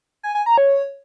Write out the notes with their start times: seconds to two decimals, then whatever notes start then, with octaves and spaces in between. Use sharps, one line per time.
0.23 G#5
0.35 G#5
0.46 A#5
0.58 C#5